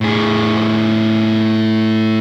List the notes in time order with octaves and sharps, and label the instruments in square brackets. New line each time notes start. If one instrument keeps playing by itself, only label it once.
[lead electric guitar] A2 G#4